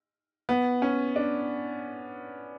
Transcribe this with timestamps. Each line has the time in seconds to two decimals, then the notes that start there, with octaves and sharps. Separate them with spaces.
0.49 B3
0.82 C#4
1.16 D4